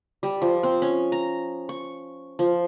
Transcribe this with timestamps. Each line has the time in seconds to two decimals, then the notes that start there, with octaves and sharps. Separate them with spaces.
0.23 G3
0.42 F3
0.63 C4
0.82 C#4
1.12 A#5
1.69 C#6
2.39 F3